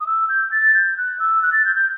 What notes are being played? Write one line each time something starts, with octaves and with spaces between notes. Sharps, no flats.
D#6
E6
G6
A6
G6
F#6
E6
F#6
A6
G6
G6